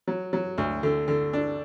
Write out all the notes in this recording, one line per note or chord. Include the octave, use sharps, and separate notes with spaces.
F#3
F#3
D2
D3
D3
D4